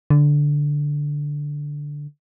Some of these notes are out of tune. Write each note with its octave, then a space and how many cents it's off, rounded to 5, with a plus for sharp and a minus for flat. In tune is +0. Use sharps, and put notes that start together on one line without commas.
D3 -5